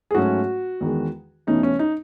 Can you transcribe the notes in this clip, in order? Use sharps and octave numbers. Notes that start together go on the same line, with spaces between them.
G#4
G#2 F#3 A3 C#4 F#4
E2 D#3 G#3
E2 B2 A3 C#4 D#4
C#4
D#4